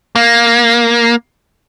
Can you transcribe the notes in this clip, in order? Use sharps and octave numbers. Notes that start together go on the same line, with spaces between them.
A#3